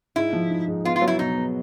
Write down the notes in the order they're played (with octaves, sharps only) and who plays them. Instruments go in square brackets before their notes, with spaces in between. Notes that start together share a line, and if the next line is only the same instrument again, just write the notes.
[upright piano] G#2 [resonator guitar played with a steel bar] E4
[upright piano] F3
D#4
G#2
[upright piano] B3 [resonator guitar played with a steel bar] F4
[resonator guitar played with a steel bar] F4
[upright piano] F#3
[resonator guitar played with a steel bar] E4
[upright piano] B2 [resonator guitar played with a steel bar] D#4
[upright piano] B3